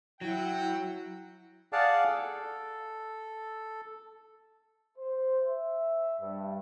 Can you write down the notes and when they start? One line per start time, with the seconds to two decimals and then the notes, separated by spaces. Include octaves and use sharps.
0.21 F#3 E4 F#5 G5
1.73 G#4 D5 F5 F#5 A5
2.07 A4
4.98 C5
5.44 E5
6.20 G2